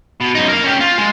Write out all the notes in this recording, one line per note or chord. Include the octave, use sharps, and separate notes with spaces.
B2
F#2 D#4
A#4 F5
C#4 G4
F4
G#3